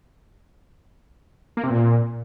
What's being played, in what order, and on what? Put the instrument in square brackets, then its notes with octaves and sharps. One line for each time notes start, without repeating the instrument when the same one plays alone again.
[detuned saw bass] A#3
C3
A#2